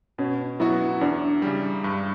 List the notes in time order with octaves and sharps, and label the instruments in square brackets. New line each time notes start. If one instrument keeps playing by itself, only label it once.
[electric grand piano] B2 [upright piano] C#4
[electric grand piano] F#3 B3 F#4 [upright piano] E4
[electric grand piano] E2 [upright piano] D4
[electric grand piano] C#3 G3
G2